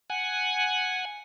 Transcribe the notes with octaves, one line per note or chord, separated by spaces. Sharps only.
F#5 G#5